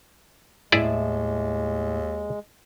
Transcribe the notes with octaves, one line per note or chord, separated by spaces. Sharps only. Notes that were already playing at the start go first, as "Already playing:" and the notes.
D#2 A2 G#3 E4 G#4 D5 E5